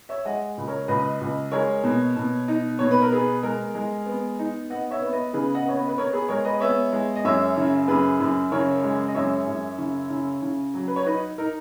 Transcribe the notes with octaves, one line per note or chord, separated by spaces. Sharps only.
C#5 E5
G#3 D#5 F#5
C#2
A#4 C#5
C#2 B4 D#5
C#2
G#3 A#4 C#5
B2
B2
D#4
B2 C#5
B4
A#4
B3 G#4 B4
G#3 A#4
G#3
B3
D#4
B3 D#5 F#5
C#5 E5
B3
B4 D#5
C#3 G#4 B4
D#5 F#5
B3 C#5
B4 D#5
B4
B3 A#4 C#5
G#4 B4
G#3 A#4 C#5
B4 D#5
B3 C#5 E5
G#3
D#5
F#2 C#5 E5
C#3
F#2 G#4 B4
F#2
C#3 A#4 C#5
G#3
D#5
F#2 C#5 E5
F#2
C#3
C#3
C#3
F#3
B4
C#5
D#4 B4 D#5
D#4 A#4